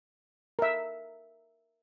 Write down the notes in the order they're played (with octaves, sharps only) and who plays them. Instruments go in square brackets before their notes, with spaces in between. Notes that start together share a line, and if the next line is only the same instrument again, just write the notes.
[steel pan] A#4 E5